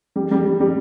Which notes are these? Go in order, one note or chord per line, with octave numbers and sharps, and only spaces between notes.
G3
G3
G3
G3